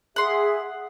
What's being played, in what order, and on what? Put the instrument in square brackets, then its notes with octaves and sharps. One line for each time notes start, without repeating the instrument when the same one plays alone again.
[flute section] G#4 E5 [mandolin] F#5 C6